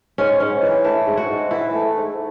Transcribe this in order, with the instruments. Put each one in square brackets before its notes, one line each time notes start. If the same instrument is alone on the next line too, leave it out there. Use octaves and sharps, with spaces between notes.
[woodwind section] G#2 [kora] C#4
[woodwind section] G#2 [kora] C#4
[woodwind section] E3
[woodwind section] A3 [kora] E4
[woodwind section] G#2
[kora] F#4
[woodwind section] G#2
[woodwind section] E3 [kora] E4
[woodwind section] A3
G#2